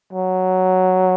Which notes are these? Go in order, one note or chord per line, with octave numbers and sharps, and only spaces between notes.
F#3